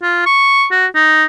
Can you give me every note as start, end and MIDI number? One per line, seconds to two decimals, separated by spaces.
0.02 0.24 65
0.26 0.66 85
0.72 0.87 66
0.95 1.25 63